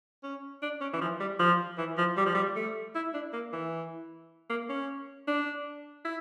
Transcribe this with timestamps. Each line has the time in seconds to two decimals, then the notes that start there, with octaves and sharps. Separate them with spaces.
0.23 C#4
0.62 D4
0.81 C#4
0.94 E3
1.01 F3
1.20 G3
1.40 F3
1.78 E3
1.98 F3
2.17 G3
2.26 F3
2.34 G3
2.56 A3
2.95 E4
3.14 D4
3.33 A#3
3.53 E3
4.50 A#3
4.69 C#4
5.28 D4
6.05 E4